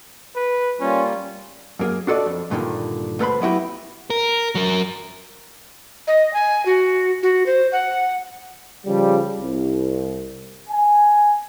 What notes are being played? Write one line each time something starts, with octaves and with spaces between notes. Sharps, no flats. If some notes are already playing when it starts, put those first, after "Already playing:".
B4
G3 A#3 C#4 F4
F#2 A#3 G#4
D4 F#4 A4 C5 D5 D#5
F2
D2 G2 A#2 D3 D#3
D2 A3 A4 B4 C5 B5
F#3 B3 E4 F#4 G4
A#4
F#3 A#4
D#5
G#5
F#4
F#4
C5
F#5
C#3 F3 G3
C2
G#5